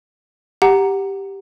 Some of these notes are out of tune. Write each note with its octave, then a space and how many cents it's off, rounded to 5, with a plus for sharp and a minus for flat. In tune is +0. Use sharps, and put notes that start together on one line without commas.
G4 +0 F#5 +0 A#5 +0